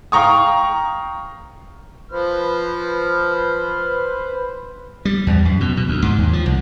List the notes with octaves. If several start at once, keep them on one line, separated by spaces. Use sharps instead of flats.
F5 G5 A#5 C#6 D#6
F3 B4 C5 F6
G3
E2
F#2
B2
B2
D2
G#2
D#2
F3
C2